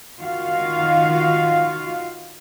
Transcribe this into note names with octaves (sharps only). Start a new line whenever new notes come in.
D#3 F4 F#4 F5